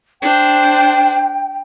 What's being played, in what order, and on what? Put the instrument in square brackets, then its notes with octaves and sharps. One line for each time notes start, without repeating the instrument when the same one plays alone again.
[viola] D4 C5 [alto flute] G5